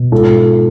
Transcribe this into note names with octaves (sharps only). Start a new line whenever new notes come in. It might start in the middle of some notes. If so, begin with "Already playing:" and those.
Already playing: B2
G#2 F4 A4